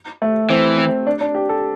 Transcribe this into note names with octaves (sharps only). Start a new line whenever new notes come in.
A3
E3 C4
C4
D4
D4
G4
A4